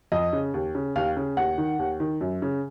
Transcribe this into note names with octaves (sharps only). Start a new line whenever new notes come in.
F2 D#5
C#3
D#2
C#3
D#2 F5
C#3
D#2 F#5
D#3
D#2
D#3
F#2
C#3